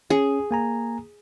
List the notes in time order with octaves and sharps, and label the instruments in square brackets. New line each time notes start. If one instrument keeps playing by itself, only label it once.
[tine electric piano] C#4 [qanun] G#4
[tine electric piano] A#3 G#5 A#5